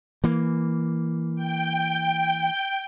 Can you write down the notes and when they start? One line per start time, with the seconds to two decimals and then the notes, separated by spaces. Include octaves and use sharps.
0.24 E3 A#3
1.35 G5